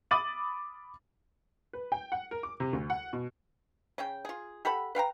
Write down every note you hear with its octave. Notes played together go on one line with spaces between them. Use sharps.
B5 D6 D#6 A6 D#7 F#7
B4
G5
F#5
A#4
D6
C3
D2
F#5
B2
C#3 C#4 G5
F4 G#4
G4 A4 F#5 B5
B4 F5 G5 A#5